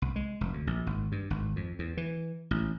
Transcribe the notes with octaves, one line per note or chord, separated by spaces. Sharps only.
C2
G#3
F1
D2
A#1
G#1
G2
G#1
F2
E2
E3
A1